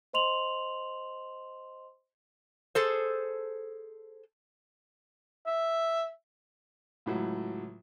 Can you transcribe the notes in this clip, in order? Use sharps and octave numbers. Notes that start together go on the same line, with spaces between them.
C5 D#5 C6 F7 F#7
G#4 A4 C5
E5
C#2 A2 F#3